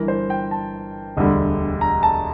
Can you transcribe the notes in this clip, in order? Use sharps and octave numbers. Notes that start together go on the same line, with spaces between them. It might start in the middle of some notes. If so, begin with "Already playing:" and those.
Already playing: G1 G2 E3 A#4
C5
G5
A5
E1 D2 D3 G3
A#5
A5